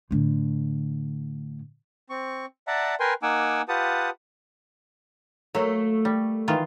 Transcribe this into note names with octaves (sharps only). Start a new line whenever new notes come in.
A2 D3
C4 C#6
D5 E5 F#5 A5 A#5
A#4 B4 G5 G#5 C6
A#3 D#4 F#5 G#5 D6 E6
F4 G4 B4 F#5 A5 D#6
F#3 A3 A#3
G3
D#3 E3 F4